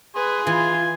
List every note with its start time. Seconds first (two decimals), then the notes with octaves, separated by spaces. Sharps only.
0.16 G#4 B4 G#5 C6
0.47 E3 F4 G#5